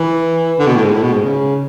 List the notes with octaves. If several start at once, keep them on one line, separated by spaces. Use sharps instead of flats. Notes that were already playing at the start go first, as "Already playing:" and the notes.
Already playing: E3
D3
B2
A2
G#2
A2
B2
G#2
C#3